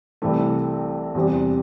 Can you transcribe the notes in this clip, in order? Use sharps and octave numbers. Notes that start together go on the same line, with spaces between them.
C2 C3 E3 A3
E2 C3 G3 C4